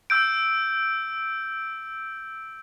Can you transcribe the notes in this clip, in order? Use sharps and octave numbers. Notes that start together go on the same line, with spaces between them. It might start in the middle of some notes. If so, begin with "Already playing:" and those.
E6 G6 D7